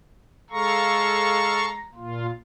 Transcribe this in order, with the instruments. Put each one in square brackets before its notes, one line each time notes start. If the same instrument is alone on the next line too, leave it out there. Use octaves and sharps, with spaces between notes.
[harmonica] G#3 A#5 [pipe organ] A4 F5 C#6
[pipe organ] A#2 F4